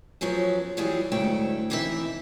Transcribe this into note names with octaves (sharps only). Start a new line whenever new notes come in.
F#2 F3 F#3 B3 G#4
E3 F#3 G3 F4 F#4 G#4
D2 G#2 F#3 A3 E4 G5
D#2 C3 E3 D#4 G#4 E5